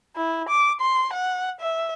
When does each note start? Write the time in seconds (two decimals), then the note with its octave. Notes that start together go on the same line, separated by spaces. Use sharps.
0.16 E4
0.49 D6
0.80 C6
1.13 F#5
1.61 E5